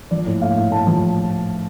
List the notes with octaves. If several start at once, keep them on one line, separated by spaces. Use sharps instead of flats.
F3 D5
A2
A2 F5
A2
A2 A5
F3